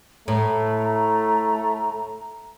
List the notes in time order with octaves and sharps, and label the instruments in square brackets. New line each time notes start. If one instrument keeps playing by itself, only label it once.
[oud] A2 [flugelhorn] A3 [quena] A#5